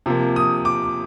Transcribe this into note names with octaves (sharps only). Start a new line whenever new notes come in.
C3 F3 A#3
D#6
D6